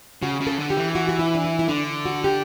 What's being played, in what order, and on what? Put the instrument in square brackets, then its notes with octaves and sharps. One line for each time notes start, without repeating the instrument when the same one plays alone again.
[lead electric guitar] C#3 [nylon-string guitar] F#4
[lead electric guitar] C#3
[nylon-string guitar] A4
[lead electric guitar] D3
[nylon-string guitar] G4
[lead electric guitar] E3
[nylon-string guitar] F#4
F#4
E4
D4
E4
E4
[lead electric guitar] D3 [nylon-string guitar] D4
[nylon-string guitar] F#4
G4